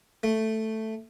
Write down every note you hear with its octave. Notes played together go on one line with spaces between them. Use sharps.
A3